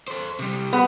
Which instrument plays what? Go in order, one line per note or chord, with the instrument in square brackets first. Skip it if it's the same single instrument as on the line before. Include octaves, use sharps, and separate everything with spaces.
[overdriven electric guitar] A4 C5
C3 G3
[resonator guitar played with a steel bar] B3